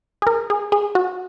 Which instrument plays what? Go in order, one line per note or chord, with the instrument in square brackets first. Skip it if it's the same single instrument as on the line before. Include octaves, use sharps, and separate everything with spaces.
[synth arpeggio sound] G#4
A#4
G#4
G#4
F#4